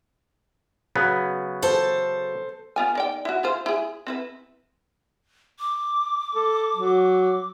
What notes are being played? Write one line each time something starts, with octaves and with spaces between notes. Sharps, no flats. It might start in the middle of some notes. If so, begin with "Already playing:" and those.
C#3 F#3 B3
A4 C5 A5
B3 F4 G#5
D#3 D5 G5
E4 F#4
E4 F4 C5
E4 G#4
C4 E4 B4
D6
A4
F#3